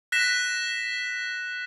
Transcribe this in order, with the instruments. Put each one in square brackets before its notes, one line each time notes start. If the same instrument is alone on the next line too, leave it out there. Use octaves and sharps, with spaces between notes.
[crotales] F#6 A#6 B6 E7